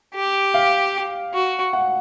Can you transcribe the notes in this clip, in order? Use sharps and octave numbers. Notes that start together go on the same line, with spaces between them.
G4
F5
F#4
F#5